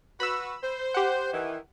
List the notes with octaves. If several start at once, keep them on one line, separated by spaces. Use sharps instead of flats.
F#4 B4 B5 E6
C5
G4 F#5
D#3 E3